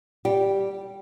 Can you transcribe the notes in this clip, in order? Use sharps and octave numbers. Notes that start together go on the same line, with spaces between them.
G3 G4